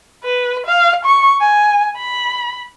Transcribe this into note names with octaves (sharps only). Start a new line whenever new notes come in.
B4
F5
C#6
G#5
B5